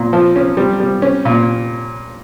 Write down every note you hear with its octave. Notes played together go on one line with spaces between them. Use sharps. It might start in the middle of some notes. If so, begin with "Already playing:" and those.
Already playing: A#2
F3
C#4
G3
G3
C#4
A#2